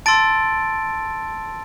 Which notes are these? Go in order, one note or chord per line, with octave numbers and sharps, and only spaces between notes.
A5 C6 E6 A6 D7